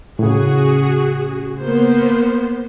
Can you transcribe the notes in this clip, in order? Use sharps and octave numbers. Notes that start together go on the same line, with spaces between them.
A2 C#3 F#4 G#4
A#3 B3 C5